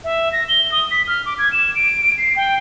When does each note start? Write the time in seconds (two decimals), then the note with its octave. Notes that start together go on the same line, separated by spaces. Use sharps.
0.04 E5
0.32 A#6
0.49 G7
0.72 D#6
0.91 B6
1.07 F6
1.26 D6
1.39 G#6
1.53 E7
1.75 D7
2.18 C7
2.36 G5